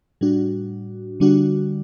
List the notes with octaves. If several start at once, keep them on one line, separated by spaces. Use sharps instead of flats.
A2 G3 D4 F#4
D3 G3 D4 F#4